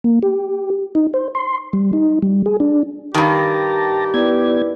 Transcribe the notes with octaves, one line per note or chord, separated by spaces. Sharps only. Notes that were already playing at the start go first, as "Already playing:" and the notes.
A#3
G4
D#4
C5
C6
G3
D#4
G3
G#4
D4
G2 D#3 G4 A5 A#5
B3 E4 B4 D5 G#6